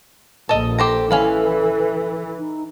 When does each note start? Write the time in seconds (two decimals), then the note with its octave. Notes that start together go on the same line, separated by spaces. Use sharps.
0.49 A#1 A4 D#5
0.78 G4 A4 C5 A#5
1.11 E3 C#4 F5 B5
2.38 D#4